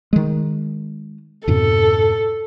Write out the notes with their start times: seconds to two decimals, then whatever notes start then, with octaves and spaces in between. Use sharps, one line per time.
0.13 D#3 G#3
1.48 F2 G#2 B2 A4